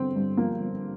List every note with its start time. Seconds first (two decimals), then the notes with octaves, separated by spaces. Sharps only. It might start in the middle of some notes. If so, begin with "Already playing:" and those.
Already playing: G1 D3 C4
0.16 G2
0.37 F3 A#3
0.60 G1